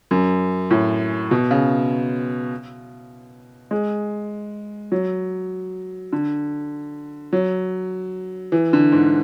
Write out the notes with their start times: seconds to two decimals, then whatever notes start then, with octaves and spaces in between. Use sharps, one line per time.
0.11 F#2
0.70 A2
1.31 B2
1.51 C#3
3.71 G#3
4.92 F#3
6.12 D3
7.33 F#3
8.52 E3
8.73 D3
8.92 G#2